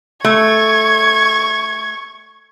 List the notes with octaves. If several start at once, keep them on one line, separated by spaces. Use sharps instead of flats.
A3 C#6 G#6